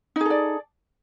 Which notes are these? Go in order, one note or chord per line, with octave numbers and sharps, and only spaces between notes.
D#4 G#4 A4 D5